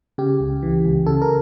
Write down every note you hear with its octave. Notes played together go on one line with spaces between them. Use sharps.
C#3 G4
C#2
E3
C#2
C#3 A4
A#4